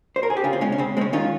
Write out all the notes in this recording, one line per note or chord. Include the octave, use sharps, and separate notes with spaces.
C5
A#4
G#4
G4
C#3 C#4 F4
C4
G#3 C#4
C#4
C#3 C4
G#3 C4 C#4
D#3 C#4 F4